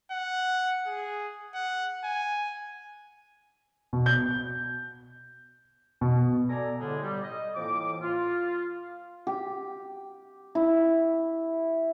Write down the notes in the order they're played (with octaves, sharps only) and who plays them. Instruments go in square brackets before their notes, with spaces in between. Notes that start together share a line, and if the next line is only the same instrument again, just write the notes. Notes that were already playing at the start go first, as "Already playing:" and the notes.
[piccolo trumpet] F#5
G#4
F#5
G#5
[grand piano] B2
G6
B2
[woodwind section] A4 D5 G#5 A#5
A2 D3 G3 G#3
G3
D#5
F2 A2 E3 A#3 D6
F4
[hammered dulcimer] G4
E4